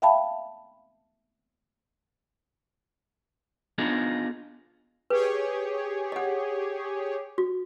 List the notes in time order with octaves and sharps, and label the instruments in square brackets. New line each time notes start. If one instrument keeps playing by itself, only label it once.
[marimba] E5 F5 G5 A5 B5
[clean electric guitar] B3 D4 D#4 F4 G#4
[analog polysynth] G4 G#4 C#5 [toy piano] B4
[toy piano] D#5 F#5
F#4